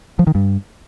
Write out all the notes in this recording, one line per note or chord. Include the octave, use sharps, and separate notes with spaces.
F3
D#3
G2